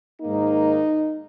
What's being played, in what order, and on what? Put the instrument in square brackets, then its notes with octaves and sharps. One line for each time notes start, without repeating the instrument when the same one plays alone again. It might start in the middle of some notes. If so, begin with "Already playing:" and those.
[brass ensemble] G#2 D#3 A#3 D#4